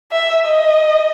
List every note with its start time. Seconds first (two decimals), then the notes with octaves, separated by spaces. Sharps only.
0.12 E5
0.46 D#5